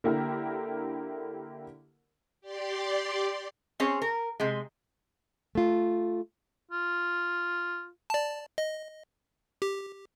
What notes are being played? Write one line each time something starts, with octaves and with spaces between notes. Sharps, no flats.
D3 A#3 E4 G4 A#4
G4 D5 C6
C4 C#4 G#4 C5 C#5
A#4
C3 G#3
A3 F4
F4
D5 A5
D#5
G4